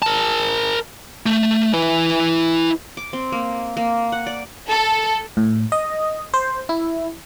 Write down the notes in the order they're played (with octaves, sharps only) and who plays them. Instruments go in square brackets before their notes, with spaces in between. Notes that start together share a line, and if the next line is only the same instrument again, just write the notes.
[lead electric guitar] A#4 A5
A3
E4 B4
[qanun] D6
C4
A#3
A#3
F#5
D5
[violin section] A4
[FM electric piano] A2
D#5
C5
E4